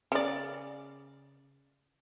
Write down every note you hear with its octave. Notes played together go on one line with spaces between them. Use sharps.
C#3 D5